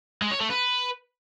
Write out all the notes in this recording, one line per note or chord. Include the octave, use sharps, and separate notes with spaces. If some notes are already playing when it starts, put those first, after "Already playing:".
G#3
C#5
A3
B4